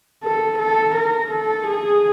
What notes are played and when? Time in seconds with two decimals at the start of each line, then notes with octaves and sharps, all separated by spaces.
0.24 A4
0.59 A4
0.96 A#4
1.32 A4
1.67 G#4